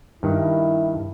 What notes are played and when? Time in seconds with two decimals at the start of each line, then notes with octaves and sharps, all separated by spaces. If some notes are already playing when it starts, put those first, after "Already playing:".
0.23 G2 D#3 E4